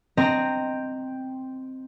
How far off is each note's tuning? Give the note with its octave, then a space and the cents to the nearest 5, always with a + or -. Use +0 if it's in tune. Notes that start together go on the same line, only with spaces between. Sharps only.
C4 +0 D#5 +0 A#5 -15